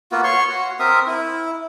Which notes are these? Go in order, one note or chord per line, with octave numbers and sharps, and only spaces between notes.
A#3 B3 F4 F#4
C#5 C6 C#6
F#4
C4 A#4 E5 D#6
E4